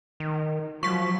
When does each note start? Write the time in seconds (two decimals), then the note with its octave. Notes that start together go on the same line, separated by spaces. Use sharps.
0.20 D#3
0.83 F3 F#3 C#6 B6